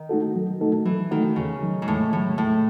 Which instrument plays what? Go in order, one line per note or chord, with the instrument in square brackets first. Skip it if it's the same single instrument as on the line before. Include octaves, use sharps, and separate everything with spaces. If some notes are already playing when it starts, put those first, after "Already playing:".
Already playing: [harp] D#3
[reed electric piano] A3 D#4 F#4 A4
F#3
A3 D#4 F#4 A4
[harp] E3 [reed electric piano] F#3
[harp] D#3 [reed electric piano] A3 D#4 F#4 A4
[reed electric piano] E2 [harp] C#3
[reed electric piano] D#3 F#3
[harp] G#2
[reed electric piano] E2 [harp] A2
[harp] A2 [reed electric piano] D#3 F#3
[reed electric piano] E2 [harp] A2